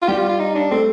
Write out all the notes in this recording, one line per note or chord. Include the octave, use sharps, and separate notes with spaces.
F4
G3 G4
F4
F4
D#4
D4
A3 C4